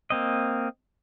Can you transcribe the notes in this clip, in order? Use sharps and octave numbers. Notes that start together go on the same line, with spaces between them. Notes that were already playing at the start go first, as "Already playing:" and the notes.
A#3 C4 D#5